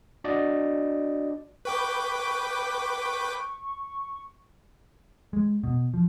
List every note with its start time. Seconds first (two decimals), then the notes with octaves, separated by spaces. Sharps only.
0.24 D4 F#4 D5 D#5
1.65 B4 G5 C#6 D6
5.33 G#3
5.63 B2
5.94 F3